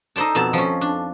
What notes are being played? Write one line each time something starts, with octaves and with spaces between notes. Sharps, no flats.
D#4 A4 C5 D5 A5
F2 B2 C4 A5
F3 C#4
D4